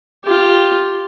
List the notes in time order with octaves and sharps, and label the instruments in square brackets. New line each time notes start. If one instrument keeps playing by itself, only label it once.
[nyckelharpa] F4 G4